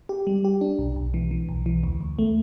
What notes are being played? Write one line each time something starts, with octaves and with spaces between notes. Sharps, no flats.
G4
G3
G4
D4
B1
B1
E3
E3
B1
E3
D2
D2
A3